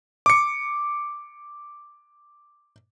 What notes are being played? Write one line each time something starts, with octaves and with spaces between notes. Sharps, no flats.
D6 C#7